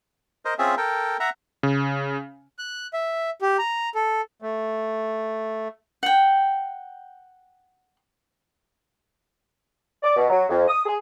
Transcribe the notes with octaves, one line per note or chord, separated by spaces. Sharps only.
A#4 C5 D#5
C4 C#4 F4 G#4 E5
A4 A#4 G5
E5 F#5 A#5
C#3
F#6
E5
G4
A#5
A4
A3
F#5 G5
D5
B2
F#3
F2
D#6
G#4